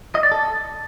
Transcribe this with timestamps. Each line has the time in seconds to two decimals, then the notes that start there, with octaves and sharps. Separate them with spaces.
0.15 D#5
0.23 D5
0.32 A4